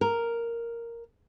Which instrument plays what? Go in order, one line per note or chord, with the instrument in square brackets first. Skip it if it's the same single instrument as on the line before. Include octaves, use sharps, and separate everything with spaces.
[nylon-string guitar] A#4